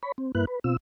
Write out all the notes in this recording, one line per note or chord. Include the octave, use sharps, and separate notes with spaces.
C#5 B5
C4
G2 A#3 E4 B4 F#6
B4
B2 C4 F4 E6